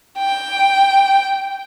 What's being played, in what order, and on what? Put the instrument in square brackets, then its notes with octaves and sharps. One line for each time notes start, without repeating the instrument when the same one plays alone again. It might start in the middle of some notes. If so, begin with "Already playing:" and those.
[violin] G5